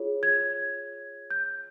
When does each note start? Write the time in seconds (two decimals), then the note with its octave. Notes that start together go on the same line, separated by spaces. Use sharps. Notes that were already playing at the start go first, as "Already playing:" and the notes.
Already playing: F4 G#4 C#5
0.23 G#6
1.31 G6